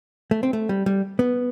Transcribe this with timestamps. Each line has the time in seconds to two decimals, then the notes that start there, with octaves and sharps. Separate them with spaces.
0.31 A3
0.43 C4
0.53 A3
0.69 G3
0.86 G3
1.19 B3